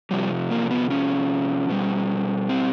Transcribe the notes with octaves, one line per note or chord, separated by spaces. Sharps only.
C3 F3 G3
A#3
B3
C#4
B2 G3
C4